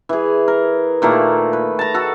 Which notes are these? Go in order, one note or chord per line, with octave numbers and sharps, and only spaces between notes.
E3 G#4
A#4
A#2 D#3 A3 A#3
B4
A5 A#5
F#4 A4